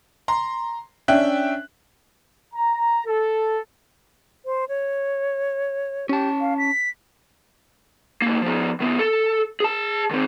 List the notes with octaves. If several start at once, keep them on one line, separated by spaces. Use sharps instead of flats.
A#5 C6
C#4 D4 E5 G5 F#6
A#5
A4
C5
C#5
C#4 G4 A5
F5
B6
D2 A#3
F3 B3
D#3 B3
A4
G#4 A5
D#3 C4